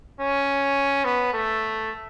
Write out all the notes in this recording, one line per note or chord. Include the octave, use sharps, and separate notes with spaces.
C#4
B3
A3